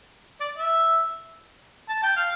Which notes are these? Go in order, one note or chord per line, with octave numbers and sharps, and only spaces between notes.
D5
E5
A5
G5
F5